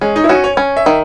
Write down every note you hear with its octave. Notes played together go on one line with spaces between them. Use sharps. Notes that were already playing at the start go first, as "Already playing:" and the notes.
G#3 C#4
D#4
E4
C#4 F#4
C#5
C#4
E5
D#3